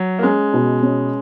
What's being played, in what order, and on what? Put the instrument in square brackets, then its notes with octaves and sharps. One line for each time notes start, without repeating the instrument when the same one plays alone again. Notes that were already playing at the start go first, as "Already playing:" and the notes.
Already playing: [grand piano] F#3
A#3
[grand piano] G#3 [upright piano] C#4
[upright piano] B2
C#4